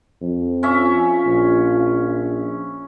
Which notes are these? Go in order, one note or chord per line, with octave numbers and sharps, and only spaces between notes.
F2
C#4 F4 E5
A#1